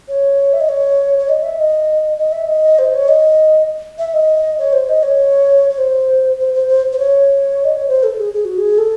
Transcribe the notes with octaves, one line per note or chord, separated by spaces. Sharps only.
C#5
E5
D#5
C#5
C#5
D#5
E5
D#5
D#5
E5
D#5
C5
C#5
D#5
E5
D#5
C#5
C5
D#5
C#5
C#5
C5
C5
C5
C5
C5
C#5
D#5
C#5
C5
A4
G#4
G#4
F#4
G#4
A4